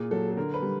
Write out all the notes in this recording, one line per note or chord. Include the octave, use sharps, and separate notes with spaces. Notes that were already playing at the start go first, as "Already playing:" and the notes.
Already playing: A#2 G#4
F#3 A4
A4
D3 A#4
B4
G3